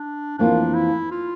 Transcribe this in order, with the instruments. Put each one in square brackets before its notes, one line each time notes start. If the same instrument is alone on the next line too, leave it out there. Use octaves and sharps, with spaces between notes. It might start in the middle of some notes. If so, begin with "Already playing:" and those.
Already playing: [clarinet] D4
[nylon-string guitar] F2 E3 A#3 F4 [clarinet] D4
[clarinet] E4
F4